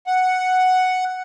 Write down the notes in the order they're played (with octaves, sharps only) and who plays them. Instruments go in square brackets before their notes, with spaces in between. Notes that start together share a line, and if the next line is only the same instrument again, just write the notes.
[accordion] F#5